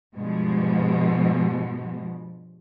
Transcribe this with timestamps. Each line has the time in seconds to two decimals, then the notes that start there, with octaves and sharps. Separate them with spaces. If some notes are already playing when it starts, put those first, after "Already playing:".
0.16 G2 B2 F3 G#3